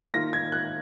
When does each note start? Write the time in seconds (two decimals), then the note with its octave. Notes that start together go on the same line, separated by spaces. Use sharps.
0.14 D#3 A#3 F4 A#6
0.33 G#6
0.52 F#6